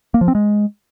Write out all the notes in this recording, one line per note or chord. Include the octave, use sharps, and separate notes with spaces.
A#3
F3
C4
G#3